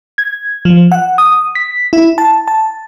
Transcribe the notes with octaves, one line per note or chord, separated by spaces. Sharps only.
G#6
F3
F#5
D#6
B6
E4
A5
A5